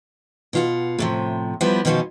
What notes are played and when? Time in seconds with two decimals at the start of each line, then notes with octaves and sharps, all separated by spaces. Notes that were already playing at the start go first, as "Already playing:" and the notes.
0.53 B2 F4 F#5
0.99 A2 C3 F3
1.61 F3 G3 B3 E4
1.85 B2 D#3 F3 C#4 F4 F#4